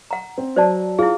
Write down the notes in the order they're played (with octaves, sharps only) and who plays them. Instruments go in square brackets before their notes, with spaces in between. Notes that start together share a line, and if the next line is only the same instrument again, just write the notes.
[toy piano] F#5 A#5
[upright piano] C4
[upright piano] F#3 [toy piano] C5 D5 A5
[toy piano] E4 G#4 [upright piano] F4